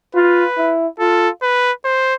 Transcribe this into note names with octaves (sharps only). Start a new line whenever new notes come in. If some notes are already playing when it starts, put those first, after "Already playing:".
F4 B4
E4
F4 A4
B4
C5